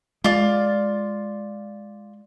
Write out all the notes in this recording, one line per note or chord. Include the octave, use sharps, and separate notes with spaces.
G#3 F4 D5